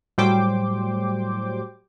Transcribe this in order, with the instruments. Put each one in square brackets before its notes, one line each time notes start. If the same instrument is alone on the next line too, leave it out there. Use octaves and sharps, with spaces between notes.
[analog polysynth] A2 F#3 G3 C5 G5 D6